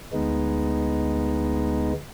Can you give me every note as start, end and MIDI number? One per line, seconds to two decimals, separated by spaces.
0.13 1.93 38
0.13 1.93 56
0.13 1.93 59
0.13 1.93 63